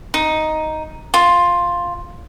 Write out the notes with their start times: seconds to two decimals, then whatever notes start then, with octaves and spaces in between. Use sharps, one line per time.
0.14 D#4
1.14 F4